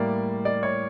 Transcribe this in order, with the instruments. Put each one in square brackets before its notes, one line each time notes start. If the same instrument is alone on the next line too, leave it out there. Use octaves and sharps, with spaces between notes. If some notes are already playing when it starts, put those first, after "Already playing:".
Already playing: [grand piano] A2 G3 A#3 D5
D5
C#5